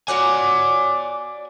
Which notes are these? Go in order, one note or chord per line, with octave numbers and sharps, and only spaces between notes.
F#4 C#5 D5 F#5 G#5 D6